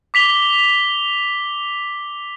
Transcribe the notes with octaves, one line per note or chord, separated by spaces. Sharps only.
D6 B6 F7 G7